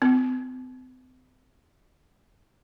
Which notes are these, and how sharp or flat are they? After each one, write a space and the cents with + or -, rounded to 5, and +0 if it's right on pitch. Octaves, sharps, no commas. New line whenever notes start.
C4 -45